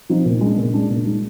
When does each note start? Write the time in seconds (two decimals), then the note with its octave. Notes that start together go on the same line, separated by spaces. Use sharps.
0.09 F3 C4 D#4
0.25 A#2
0.41 G#3 D4
0.57 A#2
0.74 G#3 D4
0.90 A#2
1.05 G#3 D#4